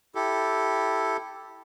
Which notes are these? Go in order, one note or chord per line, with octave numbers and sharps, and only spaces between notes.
E4 G4 A4